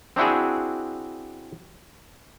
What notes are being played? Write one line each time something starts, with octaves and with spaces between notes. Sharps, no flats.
C4 D4 E4 F#4 G#4